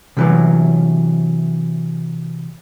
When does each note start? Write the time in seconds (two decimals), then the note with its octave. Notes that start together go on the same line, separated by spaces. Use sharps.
0.17 C3 E3 F#3